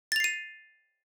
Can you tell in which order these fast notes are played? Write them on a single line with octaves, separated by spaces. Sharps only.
A6 F7 C7 D#7